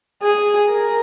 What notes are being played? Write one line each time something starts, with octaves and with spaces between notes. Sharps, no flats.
G#4
A#4